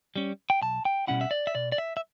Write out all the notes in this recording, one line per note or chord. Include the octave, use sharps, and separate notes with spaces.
G3 C#4
G5
B1 A5
G5
B2 G3 C#4 E4 F#5
E5
D5
E5
B2 D5
D5
E5
E5